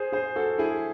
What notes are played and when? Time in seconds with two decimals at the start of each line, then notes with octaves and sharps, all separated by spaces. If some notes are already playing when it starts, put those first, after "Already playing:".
Already playing: G#4 C5
0.12 G#4 C5
0.36 F#4 A4
0.58 E4 G#4